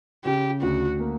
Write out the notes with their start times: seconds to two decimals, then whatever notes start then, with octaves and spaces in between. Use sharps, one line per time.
0.25 C#3 G4
0.62 D2 F#4
1.00 A#3